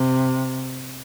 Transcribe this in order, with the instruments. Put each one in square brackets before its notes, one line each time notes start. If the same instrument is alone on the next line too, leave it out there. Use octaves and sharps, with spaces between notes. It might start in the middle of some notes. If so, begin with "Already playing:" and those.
Already playing: [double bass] C3